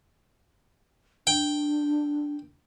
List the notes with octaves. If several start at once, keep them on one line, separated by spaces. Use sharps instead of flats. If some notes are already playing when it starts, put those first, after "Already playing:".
D4 G5